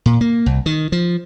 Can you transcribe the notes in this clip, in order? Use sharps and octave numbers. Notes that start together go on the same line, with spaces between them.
A#2
A#3
C2
D#3
F3